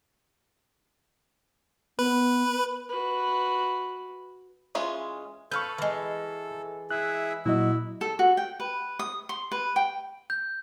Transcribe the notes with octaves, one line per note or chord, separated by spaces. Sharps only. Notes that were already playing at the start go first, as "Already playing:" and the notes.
B3 B4
F#4 B4
E3 G#3 C#4 F4
A4 B4 F5 C#6 F6 G6
E3 G#3
E4 G#4 E5 F#6
A#2 F#3 E4 F#4 D#5
A4
F#4
G5
B4
D#6
C6
B4
G5
G6